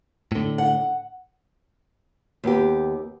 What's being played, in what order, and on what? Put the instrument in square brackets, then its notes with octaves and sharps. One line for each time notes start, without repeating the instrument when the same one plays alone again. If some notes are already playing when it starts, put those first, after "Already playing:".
[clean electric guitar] A2 D3
[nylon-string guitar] F#5
D#2 B3 G4